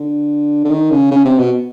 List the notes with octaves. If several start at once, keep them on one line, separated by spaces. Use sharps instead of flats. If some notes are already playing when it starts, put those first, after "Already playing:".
Already playing: D3
D3
D#3
C#3
C#3
C3
B2